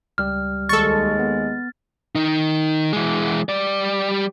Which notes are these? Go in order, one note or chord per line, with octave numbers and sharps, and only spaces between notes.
C#2 G3 G4 F6
D#2 G#3 A4 C#6 A6
B3
D#3 D#4
E3 G#3
G3 D5